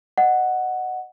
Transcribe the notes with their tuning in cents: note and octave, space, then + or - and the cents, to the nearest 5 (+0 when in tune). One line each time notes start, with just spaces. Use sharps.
D#5 -20 F#5 +0